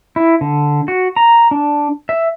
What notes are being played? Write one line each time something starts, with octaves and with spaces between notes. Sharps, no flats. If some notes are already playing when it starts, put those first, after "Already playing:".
E4
D3
F#4
A#5
D4
E5